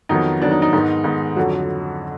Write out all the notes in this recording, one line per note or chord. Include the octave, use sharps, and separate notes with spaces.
F2 D#3 F#3 B3 D#4
F2 D#3 F#3 B3 D4
D#4
D#4
G#2 D#3 G#3 B3
G#2 D#3 G#3 B3
F2 D3 F#3 F#4